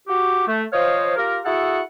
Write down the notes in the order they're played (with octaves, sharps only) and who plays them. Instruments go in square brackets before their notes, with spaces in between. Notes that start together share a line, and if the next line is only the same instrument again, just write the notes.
[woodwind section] F#4 G4
A3
F3 C5 C#5 D#5 F5
F4 G4 A#4
E4 F#4 G#4 A4 F#5